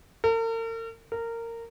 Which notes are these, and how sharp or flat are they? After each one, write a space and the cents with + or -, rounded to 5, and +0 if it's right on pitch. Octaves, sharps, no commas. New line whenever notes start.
A#4 -45
A#4 -20